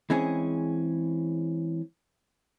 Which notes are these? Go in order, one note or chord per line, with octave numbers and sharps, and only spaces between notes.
E3 G#3 C4 C#4 G#4